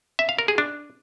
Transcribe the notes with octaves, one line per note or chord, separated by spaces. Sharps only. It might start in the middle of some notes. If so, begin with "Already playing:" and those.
E5
F5
A#4
G#4
D4